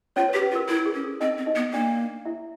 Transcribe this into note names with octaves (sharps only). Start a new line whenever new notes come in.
C#4 F4 C#5
B4
G4
B4
F4
A#4
E4 A#4
G#4
C#4
A4
C4 D#4 D#5
C4
D#4 D#5
B3
A#3 D4 D5
E4 E5